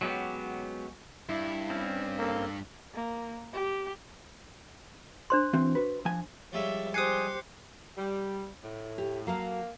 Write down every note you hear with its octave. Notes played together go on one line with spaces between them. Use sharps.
F#3 G#3 B3 C#4 G4
G2 E4
C4 C#4
A#3 A4
A#3
G4
D4 C5 C6
E3 C4 F#4
F#4 B4
F3 G#5
F3 G3 G#3 C#5 E5
G4 C5 G#5 D#6 F#6 C7 C#7
G3
A2
G4
F#3 A#3 A4 F5